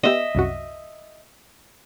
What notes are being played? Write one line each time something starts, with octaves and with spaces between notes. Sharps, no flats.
B3 G4 D#5 E5
C2 F#2 F#4